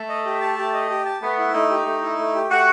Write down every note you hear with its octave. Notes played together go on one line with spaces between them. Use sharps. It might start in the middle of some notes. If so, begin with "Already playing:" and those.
Already playing: A3
D#5
G4
A5
G4
D#5
G4
A5
A3 B3
E4
A3 D#4
G4
A3
E4
A3
G4
A3 F#4